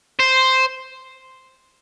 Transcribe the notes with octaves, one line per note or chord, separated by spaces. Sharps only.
C5